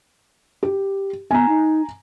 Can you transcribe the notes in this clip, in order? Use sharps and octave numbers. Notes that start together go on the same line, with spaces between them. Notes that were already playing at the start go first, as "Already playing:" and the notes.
G4
B3 G#5 A#5
D#4